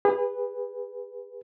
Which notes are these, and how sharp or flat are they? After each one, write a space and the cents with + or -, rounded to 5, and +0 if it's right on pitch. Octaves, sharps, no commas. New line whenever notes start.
G#4 -35 B4 +0